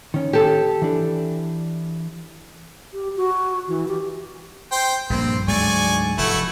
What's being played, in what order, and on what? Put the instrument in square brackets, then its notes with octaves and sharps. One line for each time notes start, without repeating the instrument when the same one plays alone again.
[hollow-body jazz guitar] D#3 C#4
[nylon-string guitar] G4 A4
[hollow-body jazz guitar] E3 D4
[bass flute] G4
F#4
E3
G4
[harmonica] C5 G5
[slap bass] A#1 G2 A#3 [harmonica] C4
[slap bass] D2 G#2 F#3 [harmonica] D5 G#5 C#6
[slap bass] F1 [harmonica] A3 E4 F#4